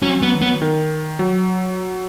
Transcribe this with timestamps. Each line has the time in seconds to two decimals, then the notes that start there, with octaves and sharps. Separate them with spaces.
0.02 F#3 C#4
0.22 B3
0.42 B3
0.62 D#3
1.19 F#3